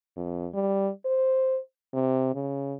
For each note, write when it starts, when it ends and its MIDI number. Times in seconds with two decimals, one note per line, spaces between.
0.17 0.47 41
0.54 0.90 55
1.05 1.59 72
1.93 2.31 48
2.35 2.75 49